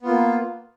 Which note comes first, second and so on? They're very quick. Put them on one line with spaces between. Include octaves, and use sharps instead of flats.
B3 F4 A#3